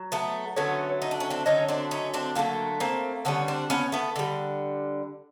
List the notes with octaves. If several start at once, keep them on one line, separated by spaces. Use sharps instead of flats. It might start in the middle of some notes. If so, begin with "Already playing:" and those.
Already playing: F#3
A3 B3
D3 F#3 A3 B3 C#4
D#4
D4
C#4
C4 D4
D3 F#3 A3 C#4 D#4
C4 D4
C#4 D#4
C4 D4
D3 F#3 A3 A#3 C4
A#3 C4
D3 G3 B3 C#4
C4 D4
B3 C#4
A3 B3
D3 G3